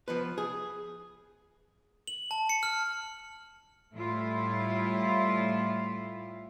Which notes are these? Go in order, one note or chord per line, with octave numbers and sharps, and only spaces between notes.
F3 B3 B4
G#4
F#7
A5
C#7
F6
A2 G3 A3 E4 F4